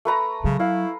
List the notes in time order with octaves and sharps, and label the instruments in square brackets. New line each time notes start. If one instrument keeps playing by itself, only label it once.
[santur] A3 B4 A#5
[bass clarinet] C#3 [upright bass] F#3
[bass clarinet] E4 [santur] F5